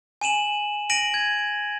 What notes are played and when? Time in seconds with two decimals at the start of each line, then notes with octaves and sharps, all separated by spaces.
0.21 G#5 D#7 E7 F#7
0.90 A#6 D7 D#7 F#7
1.14 G#6